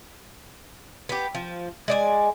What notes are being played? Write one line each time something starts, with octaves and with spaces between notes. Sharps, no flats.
B3 G4
F3
G#3 D5 G#5